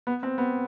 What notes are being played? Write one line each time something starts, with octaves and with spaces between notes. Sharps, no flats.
B3
C4
B3